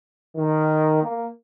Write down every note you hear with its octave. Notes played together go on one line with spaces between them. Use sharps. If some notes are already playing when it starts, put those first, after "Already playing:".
D#3
A#3